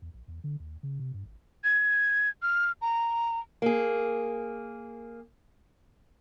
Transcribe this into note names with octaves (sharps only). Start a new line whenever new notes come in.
E2
A#1
E2
D3
D#2
C#3
C3
G2
G#1
G#6
F6
A#5
A#3 G#4